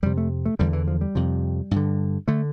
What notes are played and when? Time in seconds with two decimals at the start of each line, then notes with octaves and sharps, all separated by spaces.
0.03 F2 C3 G3
0.17 A3
0.46 A3
0.59 E2 D3 G3
0.73 E3
0.88 F3
1.01 G3
1.15 F2 C3
1.71 G2
1.76 D3
2.28 D3 A3